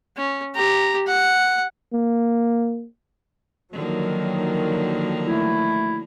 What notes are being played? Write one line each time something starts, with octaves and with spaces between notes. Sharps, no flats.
C#4
G4 A#5
F#5
A#3
D3 D#3 F3 F#3 A#3
A3 E4